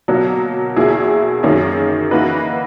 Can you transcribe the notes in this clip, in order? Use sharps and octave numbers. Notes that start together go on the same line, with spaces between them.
B2 F#3 A#3
E2 B2 A#3 E4 G#4
F#2 D#3 A#3 C#4 G#4
E3 A#3 D#4 F#4 B4